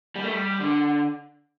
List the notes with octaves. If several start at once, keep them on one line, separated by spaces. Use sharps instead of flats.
G3
A3
G3
D3